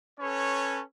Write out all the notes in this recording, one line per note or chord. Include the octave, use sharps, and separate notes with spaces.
C#4 A4 B4 C#5